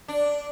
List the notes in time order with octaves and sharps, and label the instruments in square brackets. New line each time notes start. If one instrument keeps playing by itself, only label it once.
[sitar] D4